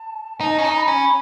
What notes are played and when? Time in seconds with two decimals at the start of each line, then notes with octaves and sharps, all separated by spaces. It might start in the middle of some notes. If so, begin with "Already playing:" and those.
Already playing: A5
0.40 D#4 A5
0.59 C#4
0.64 D#4 A5
0.76 B5
0.88 C#4